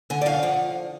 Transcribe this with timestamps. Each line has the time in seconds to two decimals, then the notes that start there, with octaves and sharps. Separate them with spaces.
0.10 D3 G#5
0.21 D5
0.26 F#2 F5
0.43 F3 F#5